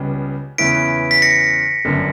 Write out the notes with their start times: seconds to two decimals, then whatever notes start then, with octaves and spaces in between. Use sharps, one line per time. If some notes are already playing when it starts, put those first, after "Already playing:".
Already playing: C#2 C#3 G3 B3
0.58 E2 C#3 E3 B3 E4 B6 D7
1.11 B6
1.22 A#6 C#7
1.85 G1 F#2 D3